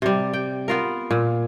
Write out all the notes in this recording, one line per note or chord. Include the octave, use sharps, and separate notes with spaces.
C3 G3
G5
B3 F4 A#4
A#2